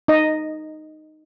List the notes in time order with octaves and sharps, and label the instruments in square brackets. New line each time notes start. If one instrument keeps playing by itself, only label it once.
[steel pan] D#4 D#5